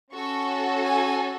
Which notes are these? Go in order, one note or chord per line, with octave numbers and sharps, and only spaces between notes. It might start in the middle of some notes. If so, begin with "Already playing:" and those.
C#4 F#4 A4 C#6
G#5